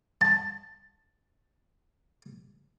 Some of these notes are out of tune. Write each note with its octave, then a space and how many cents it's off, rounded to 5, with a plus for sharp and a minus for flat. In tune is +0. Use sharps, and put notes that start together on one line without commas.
A5 +10